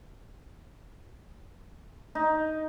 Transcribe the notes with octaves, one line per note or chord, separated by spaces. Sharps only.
D#4